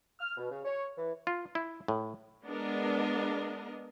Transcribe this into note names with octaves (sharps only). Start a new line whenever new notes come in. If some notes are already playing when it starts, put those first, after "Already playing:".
F6
B2
C#3
C#5
E3
F4
E4
A2
G#3 B3 D4 A#4 D#5